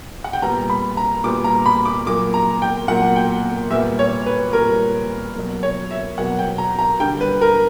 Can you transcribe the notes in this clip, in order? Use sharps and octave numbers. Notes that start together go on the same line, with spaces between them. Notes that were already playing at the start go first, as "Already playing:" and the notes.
F#5
G5
A#2 G3 B3 A#5
B5
A#5
A#2 G3 B3 D6
A#5
B5
D6
A#2 F#3 A#3 D6
A#5
G5
A#2 F#3 A#3 F#5
G5
A#2 G3 B3 E5
C#5
B4
A#2 G3 B3 A#4
B2 F#3 A#3
C#5
E5
B2 F#3 A#3 F#5
G5
A#5
A#5
D3 G3 A#3 G5
B4
A#4